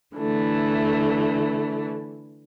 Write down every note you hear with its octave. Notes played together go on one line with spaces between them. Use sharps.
D3 E3 A3